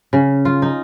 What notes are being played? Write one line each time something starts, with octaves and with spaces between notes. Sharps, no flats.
C#3
F4
D#4